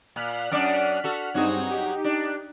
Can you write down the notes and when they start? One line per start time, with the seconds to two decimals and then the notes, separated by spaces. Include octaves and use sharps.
0.16 A#2 F6 F#6 B6
0.51 F#2 D4 D5
1.04 F#4 A4
1.34 G2 F#3 C4 D#4 F#4 G#4
1.66 D#4 G4
2.04 D4